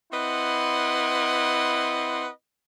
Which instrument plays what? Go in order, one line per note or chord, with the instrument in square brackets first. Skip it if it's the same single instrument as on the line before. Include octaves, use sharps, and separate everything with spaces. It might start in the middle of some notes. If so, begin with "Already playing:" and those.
[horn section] C4 E4 B4 D#5 F#5 C6